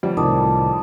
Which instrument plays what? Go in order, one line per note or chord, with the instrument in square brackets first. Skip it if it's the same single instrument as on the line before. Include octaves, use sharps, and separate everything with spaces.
[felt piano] F2 G3
[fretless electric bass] C2 A2 D#3 [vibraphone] A5 D6 D#6